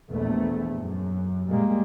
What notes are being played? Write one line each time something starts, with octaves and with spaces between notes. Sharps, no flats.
A#1 E2 A3
F#2
A#2 G3 G#3 A#3